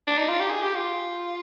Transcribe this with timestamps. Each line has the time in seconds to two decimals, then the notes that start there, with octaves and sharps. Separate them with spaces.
0.07 D4
0.18 D#4
0.28 F4
0.40 G4
0.50 G#4
0.63 G4
0.75 F4